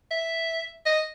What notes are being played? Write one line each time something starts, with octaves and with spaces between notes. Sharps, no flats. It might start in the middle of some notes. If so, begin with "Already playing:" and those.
E5
D#5